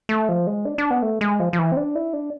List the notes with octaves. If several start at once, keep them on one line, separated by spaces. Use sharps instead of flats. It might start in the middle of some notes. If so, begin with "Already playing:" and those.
A3
F3
G#3
D4
D4
B3
A3
G#3
F3
F3
E3
C4
D4
E4
D4